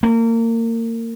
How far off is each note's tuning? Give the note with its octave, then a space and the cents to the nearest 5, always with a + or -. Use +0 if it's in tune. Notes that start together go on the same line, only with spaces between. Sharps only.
A#3 -30